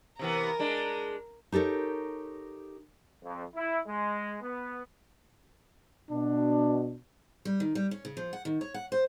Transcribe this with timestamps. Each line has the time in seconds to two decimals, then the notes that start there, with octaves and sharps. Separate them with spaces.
0.19 C3 E3 B3 A#4 A#5
0.59 G#3 D4
1.52 D#4 G4 A4 A#4 C#5
3.24 F2
3.56 E4
3.88 G#3
4.42 B3
6.11 B2 D4
7.45 G3
7.60 D#3
7.75 G3
7.91 C#4
8.05 C#3
8.17 F3
8.33 F#5
8.45 D#3
8.61 C#5
8.74 F#5
8.92 C5